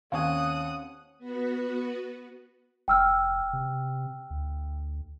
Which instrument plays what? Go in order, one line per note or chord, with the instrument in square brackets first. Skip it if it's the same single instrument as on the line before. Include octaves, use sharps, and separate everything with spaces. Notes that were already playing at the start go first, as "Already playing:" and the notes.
[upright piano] D#2 [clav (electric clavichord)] C4 C#4 C#5 [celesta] F5 [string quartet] F#5 D#6 F#6
[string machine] B3 F#4 B4
[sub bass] F1 [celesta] G5 E6 F6
[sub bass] C3
D2